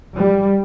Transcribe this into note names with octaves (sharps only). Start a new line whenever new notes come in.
G3